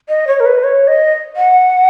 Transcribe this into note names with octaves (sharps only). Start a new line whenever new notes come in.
D#5
C#5
A#4
B4
C#5
D#5
F#5